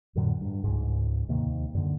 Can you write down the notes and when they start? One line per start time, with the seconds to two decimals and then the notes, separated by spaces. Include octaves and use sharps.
0.15 F2 A2 D3 F#3
0.41 G2
0.64 C#2 G#2
1.28 D#2 C3 D#3 A#3
1.75 F#2 D3